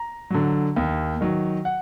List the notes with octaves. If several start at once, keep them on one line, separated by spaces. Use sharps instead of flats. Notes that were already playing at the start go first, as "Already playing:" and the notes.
Already playing: A#5
D3 F#3
D#2
D#3 F#3
F#5